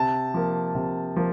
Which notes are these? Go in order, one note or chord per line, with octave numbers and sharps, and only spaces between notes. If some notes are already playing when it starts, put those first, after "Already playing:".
Already playing: C3 A5
F3 A#3
C3
F3 A#3